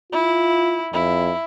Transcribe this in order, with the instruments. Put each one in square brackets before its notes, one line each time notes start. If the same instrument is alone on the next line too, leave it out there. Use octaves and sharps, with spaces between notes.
[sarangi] E4 [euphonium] F4
[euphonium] F2 [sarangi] E4